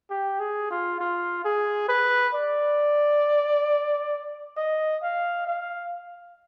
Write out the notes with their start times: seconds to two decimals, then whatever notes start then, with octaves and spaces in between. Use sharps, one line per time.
0.10 G4
0.39 G#4
0.70 F4
1.00 F4
1.44 G#4
1.88 B4
2.34 D5
4.57 D#5
5.03 F5
5.47 F5